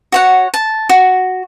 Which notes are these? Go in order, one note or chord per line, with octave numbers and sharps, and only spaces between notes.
F#4 C#5 F#5
A5
F#4